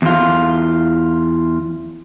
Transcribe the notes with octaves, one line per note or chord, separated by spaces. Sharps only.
E2 F4